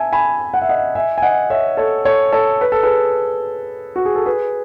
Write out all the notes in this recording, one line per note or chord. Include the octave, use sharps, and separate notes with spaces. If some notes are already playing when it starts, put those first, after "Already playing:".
Already playing: E5 G#5 A5
G#5 B5
F#5
E5
D#5 F#5
E5 G#5
G#5
D#5 F#5
C#5 E5
A4 C#5
A4 C#5
A4 C#5
B4
A4
G#4 B4
F#4
G#4
A4
G#4 B4